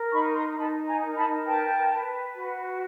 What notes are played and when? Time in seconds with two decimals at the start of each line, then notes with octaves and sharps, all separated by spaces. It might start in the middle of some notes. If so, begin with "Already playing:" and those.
Already playing: A#4
0.13 D#4 B5 C#6
0.35 A#5 C6
0.57 D#4 A5 B5
0.87 G#5 A#5
1.02 A#4
1.16 A5 B5
1.46 B4 G5 A5
1.91 B4
2.35 F#4